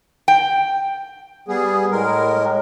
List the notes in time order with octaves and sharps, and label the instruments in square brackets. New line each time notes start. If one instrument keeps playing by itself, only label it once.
[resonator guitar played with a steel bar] G5
[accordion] G3 B3 G#4
A2 G#3 A#4